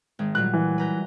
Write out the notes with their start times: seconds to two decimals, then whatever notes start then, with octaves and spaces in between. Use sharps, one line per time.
0.19 G#1 G#3
0.35 A#2 F#3 G3 F#6
0.53 E3
0.78 B4 A#5 G6